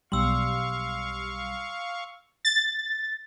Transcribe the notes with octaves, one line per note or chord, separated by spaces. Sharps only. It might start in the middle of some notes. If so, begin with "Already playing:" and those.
B1 G3 F5 C6 C#6 E6
A6